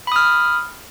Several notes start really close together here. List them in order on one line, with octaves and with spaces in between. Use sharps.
B5 D#6 F6